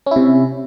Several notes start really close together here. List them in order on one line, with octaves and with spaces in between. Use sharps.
C#4 E4 C3